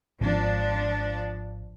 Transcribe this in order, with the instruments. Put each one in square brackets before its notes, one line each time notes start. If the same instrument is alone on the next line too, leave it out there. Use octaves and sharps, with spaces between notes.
[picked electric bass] G#1 [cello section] F3 D4